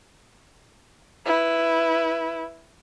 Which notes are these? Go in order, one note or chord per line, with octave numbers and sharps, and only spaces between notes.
E4 B4